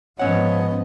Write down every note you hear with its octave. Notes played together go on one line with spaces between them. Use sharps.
G#2 F3 B3 C#4 C#5 D#5 F#5